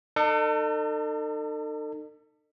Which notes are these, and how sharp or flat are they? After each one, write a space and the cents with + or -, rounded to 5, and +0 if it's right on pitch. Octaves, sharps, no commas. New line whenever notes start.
D#4 -40 A4 +35